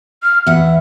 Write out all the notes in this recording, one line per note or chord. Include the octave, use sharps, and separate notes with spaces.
F6
E2 E5 F#5